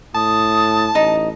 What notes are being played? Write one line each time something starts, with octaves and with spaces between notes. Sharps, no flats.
A2 A5 D#6
A1 D#4